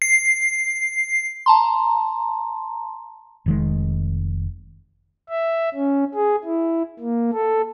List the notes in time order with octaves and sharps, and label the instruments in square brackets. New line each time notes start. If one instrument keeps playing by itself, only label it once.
[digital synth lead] C7
[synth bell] A5 A#5 C6
[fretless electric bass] F1 D#3 G#3
[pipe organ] E5
C#4
G#4
E4
A#3
A4